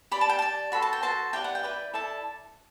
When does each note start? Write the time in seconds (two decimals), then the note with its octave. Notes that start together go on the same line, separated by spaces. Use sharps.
0.11 G4 D5 B5
0.21 A5
0.29 G5
0.39 G4 D5 A5
0.72 F#4 A4 C5 B5
0.82 A5
0.93 G5
1.02 F#4 A4 C5 A5
1.33 E4 G4 B4 D5 G5
1.44 F#5
1.55 G5
1.63 E4 G4 B4 D5
1.93 E4 A4 D5 A5